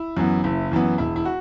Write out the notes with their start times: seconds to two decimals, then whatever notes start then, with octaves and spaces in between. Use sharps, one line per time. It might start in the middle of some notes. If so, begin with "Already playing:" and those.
Already playing: E4
0.17 F#2 E3 B3
0.44 F#1 E4
0.72 F#2 E3 B3
0.98 E1 E4
1.16 E4
1.25 F#4